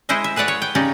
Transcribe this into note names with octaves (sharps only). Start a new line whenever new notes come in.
G#3 E4 C5 D#5 E5
E5
G#4 B4 C#5 D5 F#5
C#5
G5
C#3 C#4 D#4 G4 D5